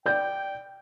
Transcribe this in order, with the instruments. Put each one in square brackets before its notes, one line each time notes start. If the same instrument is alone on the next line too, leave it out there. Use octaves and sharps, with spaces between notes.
[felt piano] D5 G6 [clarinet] G5